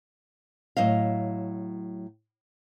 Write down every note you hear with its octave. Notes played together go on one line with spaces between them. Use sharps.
A2 F#3 C4 D#5 F5